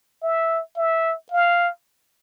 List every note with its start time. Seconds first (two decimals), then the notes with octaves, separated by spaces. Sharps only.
0.23 E5
0.77 E5
1.31 F5